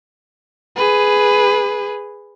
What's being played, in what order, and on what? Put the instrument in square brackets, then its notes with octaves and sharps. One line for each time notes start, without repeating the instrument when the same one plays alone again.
[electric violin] G#4 B4